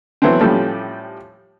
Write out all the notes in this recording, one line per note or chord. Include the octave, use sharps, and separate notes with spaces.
E3 F#3 A3 B3 C4
A2 F3 G3 C#4 G4 A4